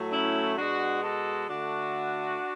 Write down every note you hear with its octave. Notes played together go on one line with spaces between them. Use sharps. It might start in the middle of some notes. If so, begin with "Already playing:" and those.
Already playing: A2 F#3 A3
C#4 E4
B2 G#3 D4 F#4
F#4 A4
D3 A3 D4 F#4